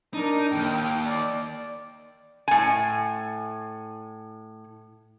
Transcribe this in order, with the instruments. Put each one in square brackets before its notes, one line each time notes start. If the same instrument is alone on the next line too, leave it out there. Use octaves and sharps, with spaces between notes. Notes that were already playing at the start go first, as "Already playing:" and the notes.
[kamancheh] D4 A#4 [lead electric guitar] D#4
[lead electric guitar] D#2 G#2 [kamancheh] G5
[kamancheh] D5
[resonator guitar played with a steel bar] A2 G#5